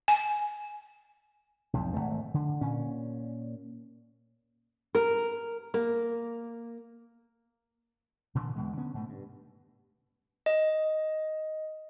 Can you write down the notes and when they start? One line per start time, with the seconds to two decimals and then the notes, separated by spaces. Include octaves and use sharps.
0.08 G#5
1.73 B1 F2 G#2
1.94 G#1 E2 A3
2.34 D3
2.61 A#2 C#4
4.95 A#4
5.74 A#3
8.35 A#2 D3 E3
8.56 E2 B2 G#3
8.77 D3 B3 C#4
8.94 G#2 B2 A3
9.09 G2
10.46 D#5